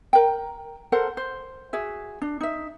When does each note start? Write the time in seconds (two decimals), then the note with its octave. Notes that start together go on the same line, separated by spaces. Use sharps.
0.13 A#4 G5
0.92 A4 A#4 C5 F#5
1.17 C5
1.73 F#4 G#4 E5
2.22 D4
2.41 D#4 E5